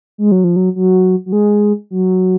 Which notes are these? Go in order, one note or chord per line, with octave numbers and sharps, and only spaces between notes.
G#3
F#3
F3
F#3
F#3
F#3
G#3
F#3